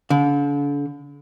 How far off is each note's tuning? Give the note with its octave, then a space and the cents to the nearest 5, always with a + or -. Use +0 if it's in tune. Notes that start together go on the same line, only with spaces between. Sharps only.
D3 -40